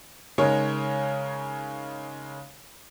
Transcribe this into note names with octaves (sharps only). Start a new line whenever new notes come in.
C#3 G#3 D#4 A#4 C#5